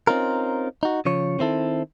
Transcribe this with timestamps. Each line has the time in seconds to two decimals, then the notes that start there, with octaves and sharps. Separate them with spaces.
0.07 C4 C#4 D#4 F4 A#4
0.83 D#4 F#4
1.05 C#3 F3 C#5
1.39 D#3 C4 E4 A4